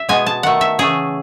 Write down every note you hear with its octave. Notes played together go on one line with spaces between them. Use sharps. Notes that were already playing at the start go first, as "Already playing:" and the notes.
Already playing: E5
B2 G#3 B3 G#5
A5
D#3 A3 F#5
E5
C#3 E3 A3 G#4